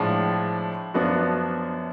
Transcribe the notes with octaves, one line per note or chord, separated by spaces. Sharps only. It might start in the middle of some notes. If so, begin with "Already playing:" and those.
Already playing: A2 F3 G#3 D4
F#2 F3 B3 D4 F#4